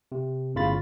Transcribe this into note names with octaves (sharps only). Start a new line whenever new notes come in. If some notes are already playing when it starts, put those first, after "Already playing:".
C3
G1 A2 C#3 F4 B5 A6